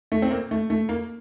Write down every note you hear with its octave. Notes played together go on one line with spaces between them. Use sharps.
A3
C4
A#3
A3
A3
A#3